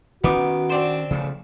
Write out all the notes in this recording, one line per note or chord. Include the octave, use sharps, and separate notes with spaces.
D#3 B3 C#4 D#4 F#4 D6
C4 D4 C5
C#3 F3 A3